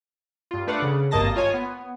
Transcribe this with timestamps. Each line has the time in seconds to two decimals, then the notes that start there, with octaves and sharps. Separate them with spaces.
0.51 G2 F4
0.67 A3 D4 B4 D5 F5 F#5
0.82 C#3
1.11 G#1 G2 A#3 D#5 A5 A#6
1.35 F4 C#5 G#5
1.54 B3